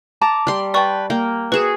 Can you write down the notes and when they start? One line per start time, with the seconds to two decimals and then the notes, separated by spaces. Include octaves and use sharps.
0.21 A5 A#5 D6
0.47 G3 C6
0.74 B4 D5 G5 A5 C#6
1.10 A#3 G5
1.52 F#4 G#4 B4 E7